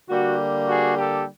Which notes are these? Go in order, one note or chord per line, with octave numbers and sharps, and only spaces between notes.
D3 G3 A#3 F#4
F#4 G#4
G4 A4